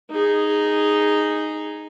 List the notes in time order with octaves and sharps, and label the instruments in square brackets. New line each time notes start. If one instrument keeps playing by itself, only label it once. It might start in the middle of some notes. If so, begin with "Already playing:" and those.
[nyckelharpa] D#4 G#4